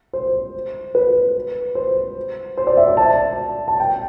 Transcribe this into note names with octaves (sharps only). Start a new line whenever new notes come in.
C5
B4
C5
C5
D5
E5
D5
A5
A5
G5